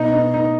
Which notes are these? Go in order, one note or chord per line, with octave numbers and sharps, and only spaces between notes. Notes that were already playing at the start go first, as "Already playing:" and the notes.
Already playing: B2 D#4
D#4
D#4